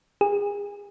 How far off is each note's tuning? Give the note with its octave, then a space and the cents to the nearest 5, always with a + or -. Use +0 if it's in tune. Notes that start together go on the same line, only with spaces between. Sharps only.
G#4 -35